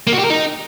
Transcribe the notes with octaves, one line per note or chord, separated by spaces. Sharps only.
A#3
F#4
G4
A#4
D#4